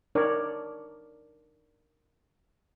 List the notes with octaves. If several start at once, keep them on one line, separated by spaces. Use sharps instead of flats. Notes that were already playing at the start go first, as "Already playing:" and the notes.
D4 D#4 A#4 C#5 D5